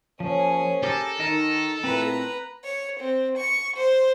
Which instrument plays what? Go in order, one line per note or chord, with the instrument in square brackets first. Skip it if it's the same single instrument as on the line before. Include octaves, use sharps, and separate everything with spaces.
[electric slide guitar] F3 [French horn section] A#3 C5 C#5 [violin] C#4 G#4
[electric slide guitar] G4 A#4 [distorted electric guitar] A4
[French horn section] D#3 [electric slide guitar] D#4 A#4 D#5 [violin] A#5
[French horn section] A#2 A3 E4 [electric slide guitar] C4 [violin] B4 A#5
[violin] C#5
C4
C#6
C5